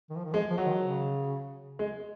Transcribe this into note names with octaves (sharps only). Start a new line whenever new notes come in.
D#3
F3
D#3
F3 G#3
F3
F#3
D#3
C#3
G#3